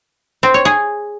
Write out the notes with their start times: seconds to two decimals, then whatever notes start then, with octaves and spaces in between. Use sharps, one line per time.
0.43 C4
0.54 C#5
0.65 G#4